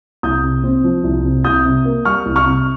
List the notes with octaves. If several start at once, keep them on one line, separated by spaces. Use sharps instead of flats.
C2 D#6 G6
C3
C4
F3
C2
C3
C2 D#6 G6
C3
A#3
G3 C#6 F6
C2
C#6 F6
C3